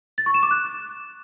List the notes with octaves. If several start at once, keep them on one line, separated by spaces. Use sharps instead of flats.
A6
C#6
E7
D6
F#6